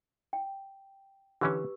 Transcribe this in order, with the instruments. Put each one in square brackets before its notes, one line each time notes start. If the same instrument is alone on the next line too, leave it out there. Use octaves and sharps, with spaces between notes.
[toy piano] G5
[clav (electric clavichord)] D3 E3 C#4 [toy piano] G4 B4 E6